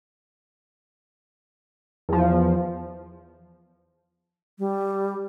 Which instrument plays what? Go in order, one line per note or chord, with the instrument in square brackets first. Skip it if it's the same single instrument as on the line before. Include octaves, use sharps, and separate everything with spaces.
[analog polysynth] E2 F3
[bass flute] G3